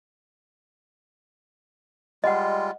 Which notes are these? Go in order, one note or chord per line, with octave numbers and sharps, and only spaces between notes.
G3 G#3 F4 D#5 F#5